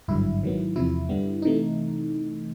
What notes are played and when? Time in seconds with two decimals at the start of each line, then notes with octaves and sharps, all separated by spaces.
0.08 G#1 G2 D3 F#3 E4
0.43 G#2 D#3 F#3 B3
0.76 E2 C3 F3 E4
1.09 G2 D3 G3 B3
1.42 C3 E3 A3 D#4